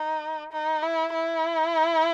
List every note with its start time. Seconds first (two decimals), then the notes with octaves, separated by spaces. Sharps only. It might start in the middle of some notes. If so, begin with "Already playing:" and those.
Already playing: D#4
0.52 D#4
0.83 E4
1.14 E4